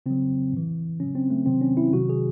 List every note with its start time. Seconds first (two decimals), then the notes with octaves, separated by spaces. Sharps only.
0.06 C#3 F#3 C4
0.52 A2 E3
1.00 C#3 F#3 C#4
1.15 C4
1.30 A3
1.46 C3 D#3 F#3 C4
1.61 C#4
1.77 E4
1.93 C3 D#3 F#3 F#4
2.09 G#4